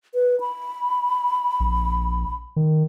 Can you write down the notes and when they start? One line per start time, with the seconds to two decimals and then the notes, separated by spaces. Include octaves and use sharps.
0.14 B4
0.40 B5
1.60 A#1
2.56 D#3